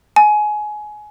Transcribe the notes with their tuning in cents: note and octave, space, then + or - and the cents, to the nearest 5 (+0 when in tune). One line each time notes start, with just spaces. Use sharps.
G#5 +20